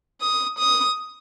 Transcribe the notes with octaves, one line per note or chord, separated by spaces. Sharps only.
D#6
D#6